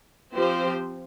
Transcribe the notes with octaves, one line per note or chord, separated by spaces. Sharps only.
F3 C4 G4 C5